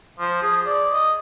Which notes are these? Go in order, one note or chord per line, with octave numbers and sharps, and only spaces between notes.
F3
G#4
D5
D#5